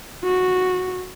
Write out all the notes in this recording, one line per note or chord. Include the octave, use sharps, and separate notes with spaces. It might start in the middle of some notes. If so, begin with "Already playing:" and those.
F#4